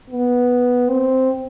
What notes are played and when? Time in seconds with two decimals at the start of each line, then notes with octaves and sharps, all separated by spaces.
0.10 B3
0.89 C4